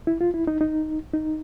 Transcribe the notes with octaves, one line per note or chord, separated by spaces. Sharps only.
E4
F4
E4
D#4
D#4
D#4